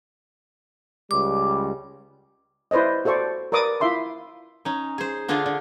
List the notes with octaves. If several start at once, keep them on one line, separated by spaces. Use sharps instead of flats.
C#2 G3 D6
E4 B4 C5 D5 D#5
F#4 A4 C5 D5 C#6
A#4 B4 D5 D6 D#6
E4 F4 E5 C6 D6
C#4 D#4
G#4 C5
D3 D4 F4 G#4 D#5 F5
D3